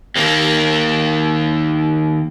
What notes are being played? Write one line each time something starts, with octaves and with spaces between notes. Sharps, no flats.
D#2 A#3